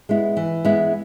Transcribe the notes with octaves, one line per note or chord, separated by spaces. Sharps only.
G#3 B3 E4
E3
G#3 B3 E4